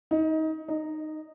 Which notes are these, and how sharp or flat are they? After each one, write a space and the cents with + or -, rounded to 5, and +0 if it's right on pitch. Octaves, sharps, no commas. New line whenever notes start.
D#4 +25
D#4 -10